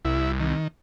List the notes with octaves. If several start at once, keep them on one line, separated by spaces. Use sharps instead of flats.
C2 E4
D#3